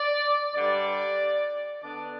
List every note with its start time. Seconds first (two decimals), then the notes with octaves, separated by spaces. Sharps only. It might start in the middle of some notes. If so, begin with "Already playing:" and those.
Already playing: D5
0.54 G2 D3 G3 D5
1.82 D3 B3 D4 D5